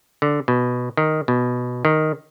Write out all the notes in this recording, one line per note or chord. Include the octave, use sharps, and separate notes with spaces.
D3
B2
D#3
B2
D#3